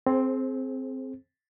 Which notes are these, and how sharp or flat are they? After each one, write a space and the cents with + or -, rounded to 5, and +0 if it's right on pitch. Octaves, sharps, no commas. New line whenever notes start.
C4 +0 G#4 +35 C5 +20